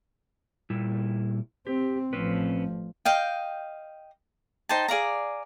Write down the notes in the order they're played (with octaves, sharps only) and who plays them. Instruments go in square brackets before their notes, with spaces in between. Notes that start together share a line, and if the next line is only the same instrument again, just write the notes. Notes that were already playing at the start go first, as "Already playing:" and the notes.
[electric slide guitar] A#2 G3 E4
[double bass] C4 [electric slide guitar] G4
[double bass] A1 F3 [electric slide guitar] C4 C#4 B4
[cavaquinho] D#5 F5 G5
D#4 C5 G5 A5
G#4 D5 F5 A#5